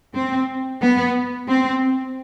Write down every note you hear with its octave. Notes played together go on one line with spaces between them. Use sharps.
C4
B3
C4